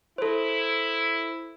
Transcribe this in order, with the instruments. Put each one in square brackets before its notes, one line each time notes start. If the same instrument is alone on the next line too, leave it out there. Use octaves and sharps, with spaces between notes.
[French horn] E4 [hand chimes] A4 C5